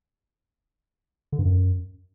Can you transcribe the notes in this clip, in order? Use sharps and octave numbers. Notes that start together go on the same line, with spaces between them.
D3
G2
F#2